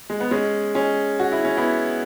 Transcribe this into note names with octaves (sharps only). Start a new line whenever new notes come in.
G#3
B3
G#3 C#4
G#3 C#4
F#4
E4
C#4
B3 E4